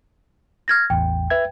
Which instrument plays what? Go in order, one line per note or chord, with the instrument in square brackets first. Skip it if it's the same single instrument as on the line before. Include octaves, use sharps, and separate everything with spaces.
[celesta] F6 G#6 A#6
[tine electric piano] A1 E2 [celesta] G5
[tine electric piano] B4 E5 G#6